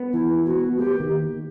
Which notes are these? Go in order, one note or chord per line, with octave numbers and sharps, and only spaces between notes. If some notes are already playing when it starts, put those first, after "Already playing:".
Already playing: B3
E3 E4
B3
F#4
B3
A#3 G4
D#3